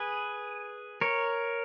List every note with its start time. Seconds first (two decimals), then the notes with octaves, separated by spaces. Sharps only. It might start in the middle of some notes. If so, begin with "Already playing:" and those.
Already playing: G#4 B4
1.01 A#4 C#5